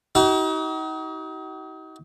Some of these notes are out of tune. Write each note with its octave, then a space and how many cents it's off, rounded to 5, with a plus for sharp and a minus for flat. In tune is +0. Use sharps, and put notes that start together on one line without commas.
D#4 +35 F#4 +45